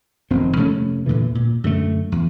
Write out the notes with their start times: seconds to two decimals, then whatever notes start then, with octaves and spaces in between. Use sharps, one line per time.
0.30 F1 F#2 D#3 C4
0.57 F2 C3 A3 C#4
1.06 E2 A#2 D3 E3
1.35 A#2
1.64 F#2 D3 A3
2.12 E2